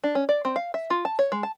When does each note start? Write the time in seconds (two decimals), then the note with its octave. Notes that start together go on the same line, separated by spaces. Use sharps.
0.04 D4
0.15 C#4
0.29 D5
0.45 C4
0.56 F5
0.74 E5
0.90 F4
1.05 A5
1.19 C#5
1.32 G#3
1.43 A5